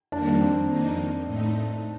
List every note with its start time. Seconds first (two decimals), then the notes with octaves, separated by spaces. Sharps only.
0.12 F2 D#3 G3 A#3 D4
0.41 C4
0.69 F2 D#3 A#3 D#4
1.26 A2 A3 D#4